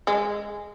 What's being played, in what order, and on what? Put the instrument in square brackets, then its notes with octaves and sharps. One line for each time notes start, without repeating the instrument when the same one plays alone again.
[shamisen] G#3